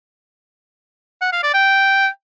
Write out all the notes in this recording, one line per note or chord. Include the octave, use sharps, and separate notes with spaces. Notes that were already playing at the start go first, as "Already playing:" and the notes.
F#5
F5
D5
G5